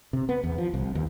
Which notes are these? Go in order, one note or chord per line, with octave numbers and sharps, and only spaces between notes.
C3
B3
E2
F3
C2
D#2